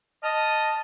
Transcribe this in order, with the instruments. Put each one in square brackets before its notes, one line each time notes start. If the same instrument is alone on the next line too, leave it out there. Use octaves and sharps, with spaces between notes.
[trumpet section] D#5 [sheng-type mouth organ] A5 F6